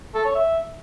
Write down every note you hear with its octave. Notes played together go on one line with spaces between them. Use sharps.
A4
C#5
E5